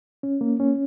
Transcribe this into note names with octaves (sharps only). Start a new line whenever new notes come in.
C#4
A#3
C#4